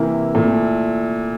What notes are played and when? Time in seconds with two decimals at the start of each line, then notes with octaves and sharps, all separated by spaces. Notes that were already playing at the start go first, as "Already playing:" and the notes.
Already playing: C3 E3 A#3 E4
0.35 A#2 A3 E4